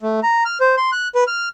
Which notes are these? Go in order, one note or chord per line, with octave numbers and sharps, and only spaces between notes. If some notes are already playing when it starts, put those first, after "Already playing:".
A3
A#5
F6
C5
C6
F#6
B4
F6